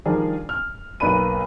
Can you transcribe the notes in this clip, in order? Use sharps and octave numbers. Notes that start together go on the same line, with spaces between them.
D#3 F3 G3 D4 G#4 A#4
F6
B1 A#3 B4 D5 B5 D#7